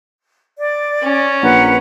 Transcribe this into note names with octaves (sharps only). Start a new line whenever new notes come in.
D5
C#4
A#1 B4 F#5 A#5